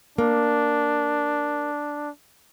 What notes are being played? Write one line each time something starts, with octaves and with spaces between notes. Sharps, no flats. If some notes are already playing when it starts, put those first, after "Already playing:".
A#3 D4